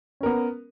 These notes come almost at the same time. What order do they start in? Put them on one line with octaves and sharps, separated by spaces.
C#4 A#4 B3